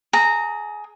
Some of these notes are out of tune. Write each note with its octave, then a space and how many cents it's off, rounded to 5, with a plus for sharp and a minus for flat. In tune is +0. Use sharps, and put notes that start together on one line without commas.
G#4 +20 A#5 -15